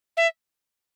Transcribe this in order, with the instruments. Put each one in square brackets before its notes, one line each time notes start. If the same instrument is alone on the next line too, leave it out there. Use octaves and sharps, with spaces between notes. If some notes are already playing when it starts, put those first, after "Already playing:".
[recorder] E5